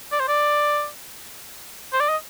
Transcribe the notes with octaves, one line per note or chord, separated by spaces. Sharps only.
D5
C5
D5
C5
D5
D#5